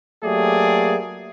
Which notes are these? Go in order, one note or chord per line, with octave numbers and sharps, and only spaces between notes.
F#3 A3 A#3 G4 G#4 D5